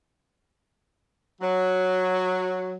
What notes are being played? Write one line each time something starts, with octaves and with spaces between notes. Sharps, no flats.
F#3